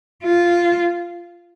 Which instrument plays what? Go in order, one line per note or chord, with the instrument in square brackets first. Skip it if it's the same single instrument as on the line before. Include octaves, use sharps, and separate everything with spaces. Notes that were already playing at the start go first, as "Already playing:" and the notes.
[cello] F4